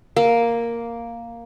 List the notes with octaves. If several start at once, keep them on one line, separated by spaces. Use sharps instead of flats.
A#3